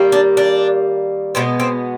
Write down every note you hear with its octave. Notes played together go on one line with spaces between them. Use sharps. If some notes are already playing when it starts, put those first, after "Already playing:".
Already playing: D#3 G3 A#3
D4
D4
B2 G#3 B3 C4
C4